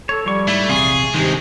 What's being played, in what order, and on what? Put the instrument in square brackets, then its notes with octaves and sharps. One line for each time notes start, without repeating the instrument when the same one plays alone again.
[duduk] A4 [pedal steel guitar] C#5
[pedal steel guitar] F3 C#6 [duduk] G3
[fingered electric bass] G#2 [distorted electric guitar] A3 [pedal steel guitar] E4
[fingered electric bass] A#1 E2 C3 [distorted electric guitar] G#4 [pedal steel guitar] F5 C6 C#6
[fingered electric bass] G2 D#3 [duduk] C3 [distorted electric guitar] G#3 C4 [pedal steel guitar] C5